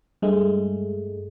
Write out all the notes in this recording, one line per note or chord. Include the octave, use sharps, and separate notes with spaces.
G2 G#3 A3